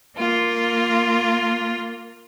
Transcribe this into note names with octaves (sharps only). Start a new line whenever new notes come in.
A#3 F4